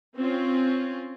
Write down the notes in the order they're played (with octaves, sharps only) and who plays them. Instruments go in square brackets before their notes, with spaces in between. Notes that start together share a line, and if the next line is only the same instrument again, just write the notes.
[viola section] C4 C#4 F4